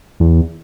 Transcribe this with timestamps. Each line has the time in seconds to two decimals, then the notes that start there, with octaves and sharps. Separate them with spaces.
0.20 E2